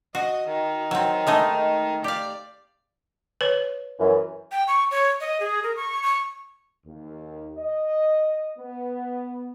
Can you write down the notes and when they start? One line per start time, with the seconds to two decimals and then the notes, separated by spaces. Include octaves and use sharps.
0.15 F#4 D#5
0.47 D#3
0.91 F#3 C4
1.27 G#3 A3 D#4
2.04 G4 D5 F5
3.41 B4 C#5
3.99 F#2 E3
4.52 G5
4.68 C#6
4.91 C#5
5.20 D#5
5.40 G#4
5.63 A#4
5.77 C#6
6.03 C#6
6.87 D#2
7.57 D#5
8.59 B3